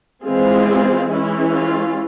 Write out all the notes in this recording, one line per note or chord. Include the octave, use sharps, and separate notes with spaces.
E3 G#3 C4 F4 G#4
E3 G#3 C#4 E4
F4